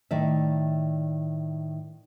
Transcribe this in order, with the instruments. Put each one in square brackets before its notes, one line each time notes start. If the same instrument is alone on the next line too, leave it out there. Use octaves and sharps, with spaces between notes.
[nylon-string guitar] A2 D#3 D5 E5